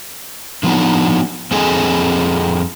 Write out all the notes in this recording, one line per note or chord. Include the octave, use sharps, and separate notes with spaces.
D3 F3 F#3 B3 D4 D#4
F2 C4 G#4 A4 D#5 G#5